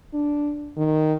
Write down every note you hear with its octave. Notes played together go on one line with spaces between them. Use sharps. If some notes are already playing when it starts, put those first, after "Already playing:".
D4
D#3